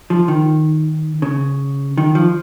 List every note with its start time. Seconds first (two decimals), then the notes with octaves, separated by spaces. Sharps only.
0.10 F3
0.28 D#3
1.22 C#3
1.98 D#3
2.15 F3